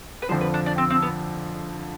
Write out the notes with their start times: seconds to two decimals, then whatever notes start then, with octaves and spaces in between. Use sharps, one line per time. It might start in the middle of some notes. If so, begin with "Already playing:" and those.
0.22 B4
0.29 F2 D3 F3 C5
0.41 B4
0.54 D4
0.66 D4
0.78 C4
0.90 C4
1.02 B3